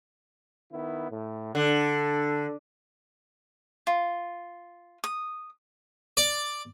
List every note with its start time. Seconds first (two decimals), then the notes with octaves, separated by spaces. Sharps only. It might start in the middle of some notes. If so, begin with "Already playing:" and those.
0.71 D#3 B3 E4
1.11 A2
1.55 D3 A4
3.87 F4
5.04 D#6
6.17 D5